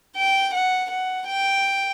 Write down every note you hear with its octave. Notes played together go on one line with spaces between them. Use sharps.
G5
F#5
F#5
G5